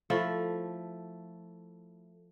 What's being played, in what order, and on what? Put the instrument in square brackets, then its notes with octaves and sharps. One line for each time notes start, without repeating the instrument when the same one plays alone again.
[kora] F3 A3 E4